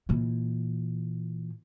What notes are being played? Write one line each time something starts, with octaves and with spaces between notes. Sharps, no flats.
A#2 E3